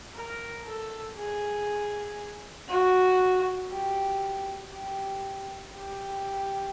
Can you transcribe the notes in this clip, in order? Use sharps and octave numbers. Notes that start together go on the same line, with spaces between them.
A#4
A4
G#4
F#4
G4
G4
G4